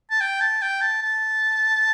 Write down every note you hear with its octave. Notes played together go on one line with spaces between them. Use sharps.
A5
G5
A5
G5
A5
A5